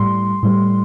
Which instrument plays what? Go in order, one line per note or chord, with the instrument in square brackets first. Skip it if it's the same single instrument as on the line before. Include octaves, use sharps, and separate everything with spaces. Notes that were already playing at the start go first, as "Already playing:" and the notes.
Already playing: [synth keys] A2 G3 C6
A2 G3